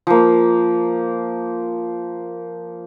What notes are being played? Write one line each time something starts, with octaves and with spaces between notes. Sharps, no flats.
F3 A#3